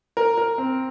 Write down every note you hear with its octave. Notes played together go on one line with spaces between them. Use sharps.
A#4
A#4
C4